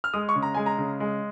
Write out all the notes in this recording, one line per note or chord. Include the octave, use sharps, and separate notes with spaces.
F6
G#3 D#6
C#6
C#3
A#5
G#3 G#5
A#5
C#3
G#3